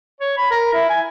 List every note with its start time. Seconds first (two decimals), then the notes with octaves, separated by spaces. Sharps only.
0.20 C#5
0.37 B5
0.51 A#4
0.74 E4
0.89 G#5